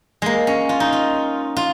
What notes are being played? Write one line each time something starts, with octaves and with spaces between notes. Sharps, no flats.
G#3 A#3
C#4
F4
D#4
F4
F4